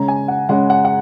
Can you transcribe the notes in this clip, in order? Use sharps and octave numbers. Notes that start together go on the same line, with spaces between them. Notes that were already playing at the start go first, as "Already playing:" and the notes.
Already playing: C#3 G#3 C#4 A#5
G#5
F#5
C#3 G#3 C#4 F#5
F#5
F#5